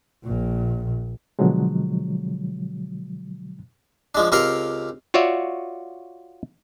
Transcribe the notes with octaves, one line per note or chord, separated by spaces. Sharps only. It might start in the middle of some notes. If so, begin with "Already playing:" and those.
A#1 A#2
B2 D3 F3 F#3 G#3
F3 G#3 D4
C#2 C4 G4 A#4 F5 C6
F4 F#4 C#5 D5 E5